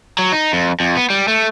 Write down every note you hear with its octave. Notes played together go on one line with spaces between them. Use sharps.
F#3
D#4
F2
F2
B3
G3
A3